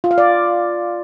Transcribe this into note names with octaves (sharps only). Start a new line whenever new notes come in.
F4
F5
D5